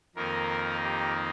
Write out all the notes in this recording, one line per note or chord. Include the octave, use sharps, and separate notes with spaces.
F2 D#3 A#3 D#4 A#4
G4